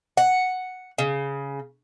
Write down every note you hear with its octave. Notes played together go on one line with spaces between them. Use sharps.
F#5
C#3